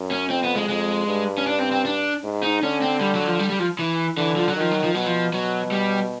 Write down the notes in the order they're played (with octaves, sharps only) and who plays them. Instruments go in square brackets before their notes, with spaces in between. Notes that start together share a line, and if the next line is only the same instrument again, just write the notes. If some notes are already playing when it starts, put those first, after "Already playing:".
Already playing: [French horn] F#2
[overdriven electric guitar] C#4
[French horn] F2 [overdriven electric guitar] C4
[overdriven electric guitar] B3
G#3
[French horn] F2 [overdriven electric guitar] G#3
[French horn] G2
[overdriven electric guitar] C#4
D4
C4
C4
D4
[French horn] G#2
[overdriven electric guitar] D#4
[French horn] D3 [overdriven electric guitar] C#4
[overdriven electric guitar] C4
G3
F#3
F3
G3
G3
F3
E3
[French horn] D3 [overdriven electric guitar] E3
[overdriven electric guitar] F3
F#3
[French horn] D#3 [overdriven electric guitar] F3
[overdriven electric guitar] F#3
F3
[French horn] B2 [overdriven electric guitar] F#3
[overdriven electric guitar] F3
[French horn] B2 [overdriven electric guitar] F#3
[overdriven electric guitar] G3